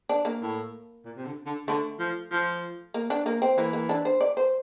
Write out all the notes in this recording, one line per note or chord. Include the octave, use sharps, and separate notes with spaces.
D4
A#3
A2
A#2
C3
D3
D3
D3 A3
F3
F3
A#3
D4
A#3
C4
E3 A#3
A#3
D4
C5
D5
C5